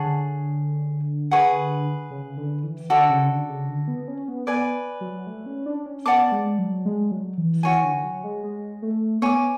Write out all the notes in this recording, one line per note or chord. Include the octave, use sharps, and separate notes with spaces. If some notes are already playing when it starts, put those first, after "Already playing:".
Already playing: D3 G#4 C#5 F#5 A5
G#4 B4 F#5 C#6
C#3
D3
E3
D3 F#4 A4 D5
C#3
D3
C#3
D3
B3
C#4
B3
B3 B4 D5 G#5
F#3
A3
C#4
D4
C#4
B3 D5 F#5 A5 D6
G#3
F#3
G#3
F#3
E3
E3 F#4 C#5 G#5
D3
F#3
G#3
G#3
A3
B3 C#5 G#5 D6